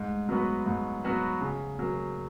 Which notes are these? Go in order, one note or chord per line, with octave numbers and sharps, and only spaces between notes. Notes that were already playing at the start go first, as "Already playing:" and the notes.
Already playing: G#2
F#3 B3 F#4 B4
G#2
F#3 B3 F#4 B4
C#3
F#3 A#3